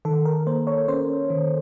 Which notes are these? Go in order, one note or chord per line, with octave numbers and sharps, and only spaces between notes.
D#3 A4
A#4
A#3 C5
C#5
C#4 C5
D#3